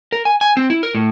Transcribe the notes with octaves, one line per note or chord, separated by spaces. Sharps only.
A#4
G#5
G#5
C4
E4
A#4
A2